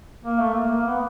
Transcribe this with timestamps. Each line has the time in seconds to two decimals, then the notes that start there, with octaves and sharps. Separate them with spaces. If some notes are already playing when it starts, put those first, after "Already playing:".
0.24 A#3
0.39 A3
0.55 A#3
0.71 A#3
0.86 B3